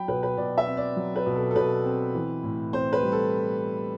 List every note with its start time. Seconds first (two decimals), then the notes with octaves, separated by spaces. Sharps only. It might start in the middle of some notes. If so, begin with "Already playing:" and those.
Already playing: F#3 G5 B5
0.08 B2 B4
0.23 B4
0.37 B2 D5
0.58 E5
0.67 C4
0.77 D5
0.96 F#3
1.16 B4
1.26 B2
1.36 A4
1.51 A4
1.55 B2 B4
1.85 C4
2.14 E3
2.43 A2
2.73 C4 C5
2.93 B4
3.03 G3
3.12 A4